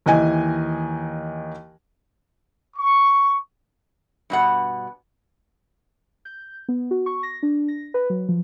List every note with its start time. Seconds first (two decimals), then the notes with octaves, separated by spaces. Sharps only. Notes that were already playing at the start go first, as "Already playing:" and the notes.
0.06 D#2 E3 D#5 G#5
2.76 C#6
4.30 G2 B2 F#5
6.25 G6
6.68 B3
6.91 F#4
7.06 C#6
7.23 A#6
7.43 D4
7.68 A#6
7.94 B4
8.10 F#3
8.29 F3